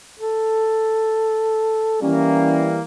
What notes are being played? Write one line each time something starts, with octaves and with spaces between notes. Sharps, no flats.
A4
E3 G3 A#3 C#4